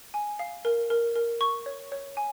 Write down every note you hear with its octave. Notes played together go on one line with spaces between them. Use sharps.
G#5
F5
A#4
A#4
A#4
C#6
C#5
C#5
G#5